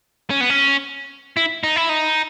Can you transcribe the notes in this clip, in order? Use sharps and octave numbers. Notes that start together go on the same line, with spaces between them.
C#4
B3
C#4
E4
D#4
E4
D#4